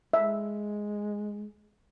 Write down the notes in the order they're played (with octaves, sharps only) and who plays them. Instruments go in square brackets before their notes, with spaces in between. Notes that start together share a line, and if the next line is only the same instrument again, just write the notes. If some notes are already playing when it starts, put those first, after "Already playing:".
[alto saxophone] G#3 [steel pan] E5